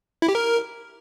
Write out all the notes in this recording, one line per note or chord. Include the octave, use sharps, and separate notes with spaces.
E4
G4
A#4